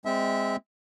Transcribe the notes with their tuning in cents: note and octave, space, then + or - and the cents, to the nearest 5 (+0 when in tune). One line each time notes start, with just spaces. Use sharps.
G#3 -25 C4 -10 E5 -20